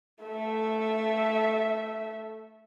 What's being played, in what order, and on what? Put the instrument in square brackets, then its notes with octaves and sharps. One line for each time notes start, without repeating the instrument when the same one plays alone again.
[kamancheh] A3 E5